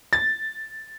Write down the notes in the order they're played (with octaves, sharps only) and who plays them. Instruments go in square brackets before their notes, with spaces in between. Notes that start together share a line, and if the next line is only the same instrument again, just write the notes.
[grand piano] A6